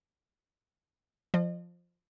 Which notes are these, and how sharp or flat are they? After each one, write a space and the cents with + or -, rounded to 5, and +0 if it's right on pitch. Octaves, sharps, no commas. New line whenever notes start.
F3 +0 D#5 -40